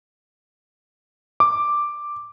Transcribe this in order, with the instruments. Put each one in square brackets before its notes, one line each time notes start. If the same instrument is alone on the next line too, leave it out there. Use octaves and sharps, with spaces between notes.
[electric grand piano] D6